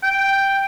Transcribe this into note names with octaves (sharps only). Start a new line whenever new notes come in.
G5